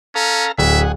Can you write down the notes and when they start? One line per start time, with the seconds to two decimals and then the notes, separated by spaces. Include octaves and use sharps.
0.15 C#4 A4 F5 A#5
0.58 D1 G#4 E5 F#5